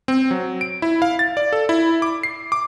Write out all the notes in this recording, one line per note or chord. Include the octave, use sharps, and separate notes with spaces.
C4
F#3
D7
E4
F5
A6
D5
A4
E4
D6
C7
D6